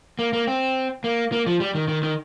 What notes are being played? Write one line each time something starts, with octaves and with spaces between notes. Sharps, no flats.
A#3
A#3
C4
A#3
A#3
F3
G3
D#3
D#3
D#3